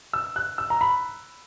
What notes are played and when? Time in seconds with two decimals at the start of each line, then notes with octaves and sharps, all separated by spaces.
0.13 E6
0.36 F#6
0.58 E6
0.70 A#5
0.81 B5